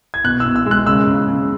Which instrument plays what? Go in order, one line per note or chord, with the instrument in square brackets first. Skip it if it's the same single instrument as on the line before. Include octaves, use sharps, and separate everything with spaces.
[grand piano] G#6
B2 F#6
E6
B2
E6
G#3
F#6
C#3 E6
C#3
C#3